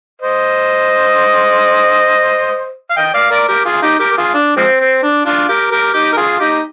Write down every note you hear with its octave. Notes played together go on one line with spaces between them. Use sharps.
C5 D#5
F5
D#5 G5
D5 F5
A#4 D5
G4 A#4
F4 G#4
D#4 G4
G4 A#4
A#4
F4 G#4
D4
F3 G#3 C4
C4
D4
D4 F4
G4 A#4
G4 A#4
D#4 G4
A#4
F4 G#4
D#4 G4